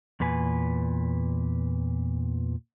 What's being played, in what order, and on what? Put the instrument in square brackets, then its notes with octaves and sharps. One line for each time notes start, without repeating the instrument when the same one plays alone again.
[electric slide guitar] E2 A#2 B4 G#5